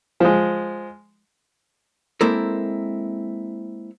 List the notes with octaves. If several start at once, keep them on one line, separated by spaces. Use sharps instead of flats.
F3 G#3
G#3 A#3 C4 E4 A4 A#4